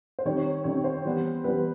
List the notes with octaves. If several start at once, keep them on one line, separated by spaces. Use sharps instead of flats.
C5
D#3 G3 C4 D#4 C#5
D#3 G3 C4 D#4 C#5
C5
E3 G3 B3
E3 G3 B3 B4